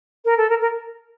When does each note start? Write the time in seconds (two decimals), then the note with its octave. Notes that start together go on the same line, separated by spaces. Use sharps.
0.25 A#4
0.37 A4
0.49 A#4
0.61 A#4